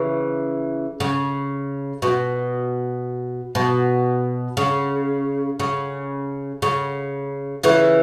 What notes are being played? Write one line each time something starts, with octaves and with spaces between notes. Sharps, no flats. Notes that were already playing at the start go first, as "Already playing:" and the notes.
Already playing: C#3 E3
C#3
B2
B2
C#3
C#3
C#3
C#3 E3